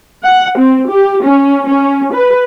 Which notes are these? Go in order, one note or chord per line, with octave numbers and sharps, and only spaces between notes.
F#5
C4
G4
C#4
C#4
B4